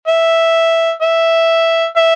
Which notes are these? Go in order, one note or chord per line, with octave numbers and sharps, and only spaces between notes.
E5
E5
E5